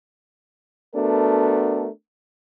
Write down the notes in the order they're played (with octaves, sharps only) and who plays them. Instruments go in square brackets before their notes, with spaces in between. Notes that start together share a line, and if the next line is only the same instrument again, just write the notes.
[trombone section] A3 B3 D4 F#4 A4 A#4